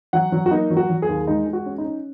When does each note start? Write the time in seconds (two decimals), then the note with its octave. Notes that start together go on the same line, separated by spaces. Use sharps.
0.13 F#3 F#5
0.32 F#3
0.46 F#4
0.51 A#3 D#4
0.71 F#3
0.77 F#4
0.90 F#3
1.02 G#4
1.08 D#2
1.27 G#3 D#4
1.47 G#3
1.53 F#4
1.66 C#4
1.78 D#4
1.85 C#4